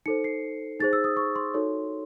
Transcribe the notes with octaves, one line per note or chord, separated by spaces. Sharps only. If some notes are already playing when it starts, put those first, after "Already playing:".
D#4 A4 C5 C#7
C7
D#4 G#4 C5 A6
E6
D#6
C#6
C6
D#4 F#4 A4 C#5